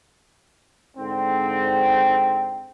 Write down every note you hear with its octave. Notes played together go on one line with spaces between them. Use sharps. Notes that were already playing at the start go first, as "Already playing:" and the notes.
G#2 D3 C4